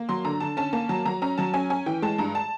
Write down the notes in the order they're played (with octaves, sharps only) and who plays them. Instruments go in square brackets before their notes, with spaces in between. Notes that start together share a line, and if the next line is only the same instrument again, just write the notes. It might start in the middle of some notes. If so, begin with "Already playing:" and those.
Already playing: [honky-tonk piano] A#3
F#3 C6
D3 A#5
D3 A5
C#4 A5
A#3 A5
F#3 A5
F#3 A#5
C#4 A#5
F#3 A5
C#4 G#5
C#4 G#5
E3 G5
G#3 A5
G2 A#5
A5